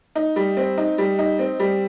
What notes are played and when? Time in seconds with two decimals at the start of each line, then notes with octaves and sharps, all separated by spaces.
0.15 D#4
0.36 G3
0.57 C4
0.78 D#4
0.98 G3
1.19 D#4
1.39 C4
1.60 G3